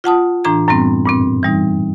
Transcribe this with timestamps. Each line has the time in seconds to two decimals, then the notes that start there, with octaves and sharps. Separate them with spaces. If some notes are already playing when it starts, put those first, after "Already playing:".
0.04 F4 F#5 A5 D#6
0.44 A2 E3 D4 A#5 G#6
0.68 F#2 A2 G3 B3 C4
1.06 G2 A#2 C4
1.43 E3 G3 D#4